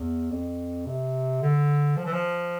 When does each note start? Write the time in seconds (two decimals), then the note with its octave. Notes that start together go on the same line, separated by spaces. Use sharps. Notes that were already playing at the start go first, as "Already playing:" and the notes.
Already playing: E2
0.31 F2
0.87 C3
1.42 D3
1.97 F3
2.05 E3
2.13 F3